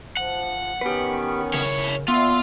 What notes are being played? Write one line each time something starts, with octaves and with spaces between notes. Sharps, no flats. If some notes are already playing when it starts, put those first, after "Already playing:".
F3 F#5
D#3 B3 C#4 G4 B4
C#3 E4 A#4 C#5
A#2 B3 F4 E5 C6